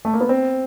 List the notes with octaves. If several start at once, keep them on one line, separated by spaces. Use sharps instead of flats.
A3
A#3
B3
C4